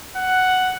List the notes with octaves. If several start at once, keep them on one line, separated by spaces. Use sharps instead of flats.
F#5